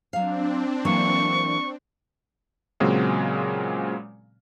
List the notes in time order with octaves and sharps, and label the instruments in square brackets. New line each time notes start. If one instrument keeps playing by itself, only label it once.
[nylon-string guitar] F#3 F5 [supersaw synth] C4 D4
[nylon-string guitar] E3 F#3 A#3 [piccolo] C#6
[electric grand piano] A#2 C#3 F#3 G#3 C4